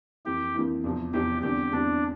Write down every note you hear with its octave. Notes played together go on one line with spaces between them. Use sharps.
F2 E3 A#3 E4 G4
F2 E3 A#3 E4
E2 C3 F3 C4
E2 C3 F3 C4 G4
E2 D3 G3 C4 G4
E2 D3 G3 C4 D4